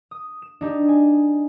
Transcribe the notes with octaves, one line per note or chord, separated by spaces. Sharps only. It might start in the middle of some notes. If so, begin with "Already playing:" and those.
D#6
E7
D4 D#4 G4
G#5